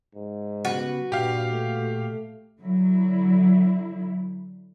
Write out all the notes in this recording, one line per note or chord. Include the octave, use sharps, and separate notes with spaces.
G#2
C#3 G3 B3 F#4 B4
G2 A#2 G4 F5
A3
D3 F#3 E4